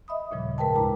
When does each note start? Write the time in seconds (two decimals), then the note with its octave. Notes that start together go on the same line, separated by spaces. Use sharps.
0.08 D#5 E5 B5 D#6
0.31 D#2 A#2 C#3 F3 G3
0.58 G#2 G#3 A#4 B4 G5 A5
0.75 D2 E4 A#5 D6